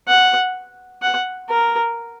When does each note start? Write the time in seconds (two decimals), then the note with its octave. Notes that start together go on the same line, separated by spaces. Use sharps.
0.08 F#5
1.02 F#5
1.49 A#4